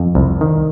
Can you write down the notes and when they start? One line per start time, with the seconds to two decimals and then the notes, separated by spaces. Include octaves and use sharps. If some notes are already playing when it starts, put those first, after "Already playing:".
Already playing: F2
0.15 C2
0.41 D#3